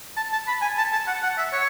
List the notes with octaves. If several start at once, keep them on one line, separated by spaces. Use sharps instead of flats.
A5
A5
B5
G#5
A5
A5
F#5
F#5
E5
C#5